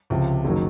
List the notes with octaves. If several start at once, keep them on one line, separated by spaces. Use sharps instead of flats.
C#2 C3 F3
F#1 D#3 F#3